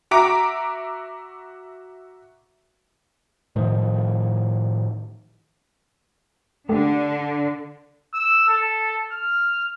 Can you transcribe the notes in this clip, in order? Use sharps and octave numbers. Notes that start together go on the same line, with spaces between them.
F#4 E5 A#5 D6 D7
A2 D#3 F3
D3 A3 G4 A4
E6
A4
F6